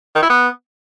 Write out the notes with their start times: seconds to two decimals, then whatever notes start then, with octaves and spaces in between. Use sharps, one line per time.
0.15 D#3
0.22 E4
0.29 B3